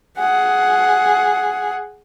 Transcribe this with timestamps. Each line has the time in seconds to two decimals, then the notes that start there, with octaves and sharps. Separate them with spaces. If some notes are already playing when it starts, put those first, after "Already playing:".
0.19 G#4 F#5